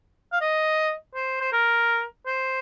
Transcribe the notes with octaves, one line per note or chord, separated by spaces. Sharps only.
F5
D#5
C5
C5
A#4
C5